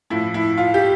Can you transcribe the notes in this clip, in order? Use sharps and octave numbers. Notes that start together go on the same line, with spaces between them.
A2 F3 E4
E4
F4
G4